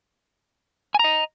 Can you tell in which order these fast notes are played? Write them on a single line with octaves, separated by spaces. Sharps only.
G#5 A#5 D#5